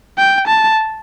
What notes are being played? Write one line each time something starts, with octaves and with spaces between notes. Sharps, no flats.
G5
A5